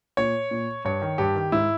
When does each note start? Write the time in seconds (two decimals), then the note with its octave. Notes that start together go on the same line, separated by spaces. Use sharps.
0.17 A#2 C#5
0.51 A#2
0.85 G2 C#5
1.02 D#3
1.18 G2 G4
1.35 D#3
1.52 G#2 E4